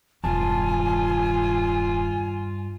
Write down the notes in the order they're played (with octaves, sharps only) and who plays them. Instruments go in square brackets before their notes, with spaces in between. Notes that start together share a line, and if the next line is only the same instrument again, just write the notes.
[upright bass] E1 D#3 [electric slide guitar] G2 A5 [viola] F4 [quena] G#5